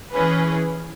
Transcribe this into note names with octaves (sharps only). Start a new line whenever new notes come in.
E3 C#4 G#4 B4